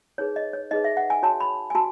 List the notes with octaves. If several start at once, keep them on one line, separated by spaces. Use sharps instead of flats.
D#4 G#4 B4 C#5
D#5
C#5
D#4 G#4 B4 D#5
E5
F#5
G#5
F#4 C#5 A5
B5
G#5
F#4 A5